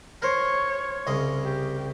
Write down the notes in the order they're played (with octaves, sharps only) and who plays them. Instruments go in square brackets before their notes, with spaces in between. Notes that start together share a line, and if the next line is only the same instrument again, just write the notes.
[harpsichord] A#4 C5 [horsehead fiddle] C#5
[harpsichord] C2 C#3 D#5
[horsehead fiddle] G4